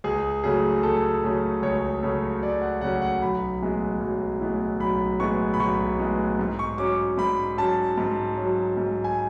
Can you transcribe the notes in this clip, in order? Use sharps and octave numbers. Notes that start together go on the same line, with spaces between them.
C#2 G#4
C#3 F#3 A3 C#4 G#4
C#2 A4
C#3 F#3 A3 C#4
C#2 C#5
C#3 F#3 A3 C#4
C#2 D5
F#5
C#3 F#3 A3 C#4 F#5
F#5
B1 B5
A2 E3 G#3 B3
B1
A2 E3 G#3 B3
B1 B5
A2 E3 G#3 B3 C#6
B5
B1 C#6
A2 E3 G#3 B3
G#2
C#6
F#3 C#4 D6
G#2 B5
F#3 C#4 A5
G#2
F#3 C#4
G#2
G#5